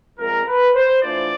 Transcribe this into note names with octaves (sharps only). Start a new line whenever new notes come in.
A#2 F3 G#3 C4 A#4
B4
C5
E3 A3 D4 F4 D5